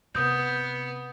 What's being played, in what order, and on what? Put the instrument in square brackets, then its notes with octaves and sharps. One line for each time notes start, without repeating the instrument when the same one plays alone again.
[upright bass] C3 [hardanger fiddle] B3 [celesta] D#6 G6